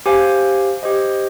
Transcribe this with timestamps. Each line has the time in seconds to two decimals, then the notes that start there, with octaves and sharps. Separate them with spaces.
0.06 G4 C5 F5 G#5
0.83 G4 C5 D#5